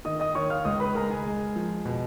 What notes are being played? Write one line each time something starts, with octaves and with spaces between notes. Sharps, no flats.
D#3 D#5 D#6
D#5 D#6
D#3 C#5 C#6
F5 F6
C#2 D#5 D#6
B4 B5
G#3 A#4 A#5
G#4 G#5
G#3
F3
B2